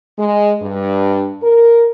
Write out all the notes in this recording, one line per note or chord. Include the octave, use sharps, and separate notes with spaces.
G#3
G2
A#4